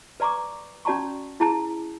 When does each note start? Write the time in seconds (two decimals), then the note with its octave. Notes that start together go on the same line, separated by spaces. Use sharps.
0.20 B4 D5 A#5 C#6 D6
0.85 C#4 F#4 D5 A5 A#5 C#6
1.40 E4 G#4 A5 A#5